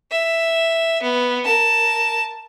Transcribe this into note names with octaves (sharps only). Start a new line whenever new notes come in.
E5
B3
A#4 A5